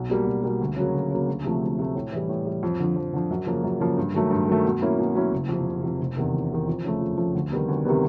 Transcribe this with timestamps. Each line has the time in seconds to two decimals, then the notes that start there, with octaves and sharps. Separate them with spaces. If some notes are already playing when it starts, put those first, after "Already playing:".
Already playing: B1
0.10 B2 G3 A#3
0.27 B1
0.44 B2 G3 A#3
0.61 D2
0.77 C#3 F#3 A#3
0.94 D2
1.11 C#3 F#3 A#3
1.28 D2
1.44 C3 F3 A3
1.62 D2
1.79 C3 F3 A3
1.95 A2
2.12 E3 G3
2.29 A2
2.45 E3 G3
2.63 F2
2.80 D3 F3
2.96 F2
3.13 D3 F3
3.30 F#2
3.47 C#3 F3 A#3
3.64 F#2
3.80 C#3 F3 A#3
3.98 G2
4.14 D#3 F#3 A3
4.31 G2
4.48 D#3 F#3 A3
4.65 B2
4.82 F#3 A#3 C#4 E4
4.99 B2
5.15 F#3 A#3 C#4 E4
5.32 F#1
5.49 F2 C3
5.66 F#1
5.83 F2 C3
6.00 F1
6.17 E2 C3 D#3
6.34 F1
6.50 E2 C3 D#3
6.67 F2
6.84 C#3 F3 A3
7.01 F2
7.18 C#3 F3 A3
7.35 D2
7.52 C3 D#3 G3 B3
7.68 D2
7.85 C3 D#3 G3 B3